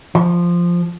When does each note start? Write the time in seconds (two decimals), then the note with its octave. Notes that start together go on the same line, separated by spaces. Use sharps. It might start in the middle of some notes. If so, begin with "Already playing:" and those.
0.15 F3